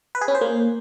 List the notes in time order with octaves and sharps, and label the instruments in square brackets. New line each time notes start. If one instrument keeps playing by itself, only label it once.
[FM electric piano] B4
G#4
C#4
C5
A#3